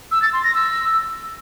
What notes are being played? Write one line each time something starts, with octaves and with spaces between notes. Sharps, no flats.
E6
A6
C6
A#6
E6